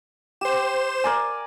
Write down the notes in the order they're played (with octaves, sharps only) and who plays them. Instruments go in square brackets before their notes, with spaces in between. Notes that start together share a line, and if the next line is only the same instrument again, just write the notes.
[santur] G4 [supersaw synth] C5 E7
[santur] A#4 D5 G#5